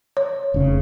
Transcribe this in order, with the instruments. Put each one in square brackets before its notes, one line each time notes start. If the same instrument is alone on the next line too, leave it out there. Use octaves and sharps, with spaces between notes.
[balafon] C#5
[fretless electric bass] F1 C#3